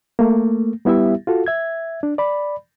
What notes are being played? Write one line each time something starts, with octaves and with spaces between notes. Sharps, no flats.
A3 A#3
G3 B3 E4 G4 E5
F4 F#4 A4
E5 G#6
D4
D5 B5